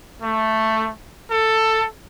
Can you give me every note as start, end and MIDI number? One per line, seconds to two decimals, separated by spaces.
0.23 0.90 57
1.31 1.85 69